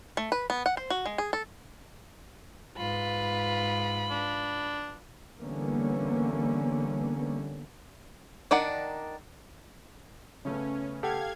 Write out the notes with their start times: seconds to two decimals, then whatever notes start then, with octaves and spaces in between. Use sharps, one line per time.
0.17 A3
0.32 B4
0.50 B3
0.66 F#5
0.77 C5
0.90 F#4
1.06 G#3
1.18 G#4
1.33 A4
2.78 G#2 F4 B4 B5
4.11 D4
5.40 D3 E3 G3 A#3 B3 C#4
8.51 D#3 D4 A#4 D5 F#5
10.45 C#3 A3 B3 C#4
11.03 G4 A4 F5 F#5 G#6